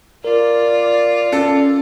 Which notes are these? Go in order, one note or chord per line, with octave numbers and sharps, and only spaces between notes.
F4 A#4 D5
C#4 A4